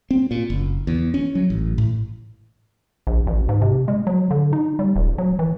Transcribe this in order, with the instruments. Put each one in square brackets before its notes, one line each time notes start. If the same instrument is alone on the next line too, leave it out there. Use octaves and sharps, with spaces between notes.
[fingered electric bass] C4
A#2
F#1
E2
C#4
F#3
A1
A2
[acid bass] A#1
A1
G#2
C3
G#3
F#3
D3
D#4
G3
D#1
F#3
E3